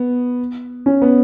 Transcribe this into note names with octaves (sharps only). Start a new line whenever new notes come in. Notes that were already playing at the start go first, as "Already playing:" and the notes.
Already playing: B3
C#4
B3